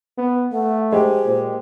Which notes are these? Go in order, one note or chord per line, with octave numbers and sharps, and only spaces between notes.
B3
A3 F#5
G#3 G4 C5
A#2